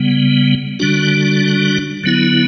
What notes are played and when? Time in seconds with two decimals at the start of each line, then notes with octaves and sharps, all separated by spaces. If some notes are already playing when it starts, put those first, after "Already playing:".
Already playing: C#3 G3 B3
0.79 D3 G3 D4 F#4
2.04 D3 F#3 B3 E4